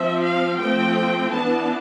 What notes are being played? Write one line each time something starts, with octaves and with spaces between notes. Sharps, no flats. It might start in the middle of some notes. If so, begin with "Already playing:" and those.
Already playing: F3 C4 E5
F5
F3 A3 C4 G5
E3 B3 D4 A5